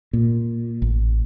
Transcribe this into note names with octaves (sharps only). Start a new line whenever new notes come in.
A#2
A1